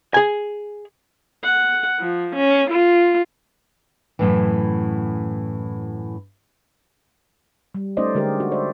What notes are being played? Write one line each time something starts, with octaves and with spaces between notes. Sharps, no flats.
G#4 G#5
F#5
F3
C#4
F4
F#2 A2 E3
G3
A3 C#4 D#4 C5 D5 D#5
D3 G#3 G4 A#4
F#4
C5 D5 E5